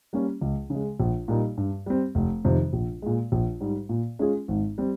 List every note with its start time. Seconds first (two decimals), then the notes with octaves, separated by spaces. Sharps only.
0.13 G3 A#3 C#4
0.41 C#2
0.70 C#3
0.75 G#3
1.00 A#1
1.28 A#2 G3 A#3 D#4
1.57 G2
1.86 G3 C4
2.15 F1
2.45 F2 C3 D#3
2.73 A#1
3.02 A#2 G#3
3.32 A#1
3.60 G#2 G3
3.89 A#2
4.19 G#3 C#4 F4 G#4
4.48 G#1
4.78 G3 C4